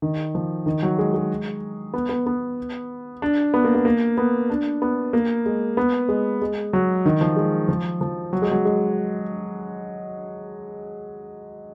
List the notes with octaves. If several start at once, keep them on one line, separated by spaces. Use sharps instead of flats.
D#3
F3
D#3
F#3
G#3
G#3
B3
B3
B3
D4
B3
A#3
B3
A#3
B3
D4
B3
A#3
G#3
B3
G#3
G#3
F#3
D#3
F3
G#3
F3
F3
F#3
G#3
F#3
G#3